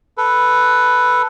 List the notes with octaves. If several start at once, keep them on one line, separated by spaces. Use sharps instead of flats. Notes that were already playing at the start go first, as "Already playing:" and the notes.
A4 B4